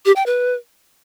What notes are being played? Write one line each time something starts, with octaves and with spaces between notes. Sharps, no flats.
G4
G5
B4